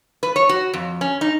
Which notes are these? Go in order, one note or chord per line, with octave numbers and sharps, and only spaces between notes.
B4
C#5
F#4
F2
C#4
D#4